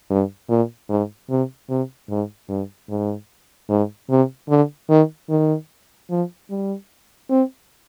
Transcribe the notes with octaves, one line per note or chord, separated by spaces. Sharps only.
G2
A#2
G#2
C3
C3
G#2
G2
G#2
G#2
C3
D3
D#3
D#3
F3
G3
C4